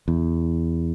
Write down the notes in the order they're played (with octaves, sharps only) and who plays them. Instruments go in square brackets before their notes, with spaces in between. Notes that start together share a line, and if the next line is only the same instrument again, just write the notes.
[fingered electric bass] E2